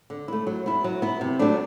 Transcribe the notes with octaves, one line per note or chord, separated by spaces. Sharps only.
D3
A3 E4
F#3
B3 E4
F#3
B3 E4
C3
F#3 A3 D4